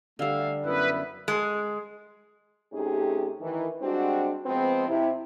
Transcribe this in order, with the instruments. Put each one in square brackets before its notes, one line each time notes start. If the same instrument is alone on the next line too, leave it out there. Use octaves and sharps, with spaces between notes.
[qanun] D3 G3 [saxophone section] A3 E5 F5
[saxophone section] F#2 B3 E4 [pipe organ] B4
[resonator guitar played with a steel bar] G#3
[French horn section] C3 A3 C#4 D#4 G4 G#4
D#3 E3
G3 G#3 C4 D4 F#4
F3 G#3 B3 C4
C3 E4